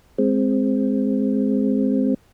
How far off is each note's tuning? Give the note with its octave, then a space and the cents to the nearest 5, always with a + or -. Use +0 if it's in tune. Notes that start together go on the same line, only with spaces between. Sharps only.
G#3 +0 C4 +0